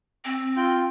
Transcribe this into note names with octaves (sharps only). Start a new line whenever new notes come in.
C4
F4 G5